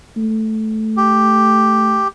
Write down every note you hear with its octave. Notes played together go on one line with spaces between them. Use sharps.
A3
G4